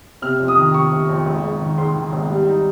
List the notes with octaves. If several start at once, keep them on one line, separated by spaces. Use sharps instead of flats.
C3 F6
F2
D#6
D#3
F1 C#6
C3
F2
G#1
G#2
D#3
G#2 C6
D#3
G#1
G3
D#4